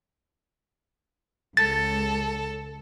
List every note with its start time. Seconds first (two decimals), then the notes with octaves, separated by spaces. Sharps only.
1.57 C#2 A4 A6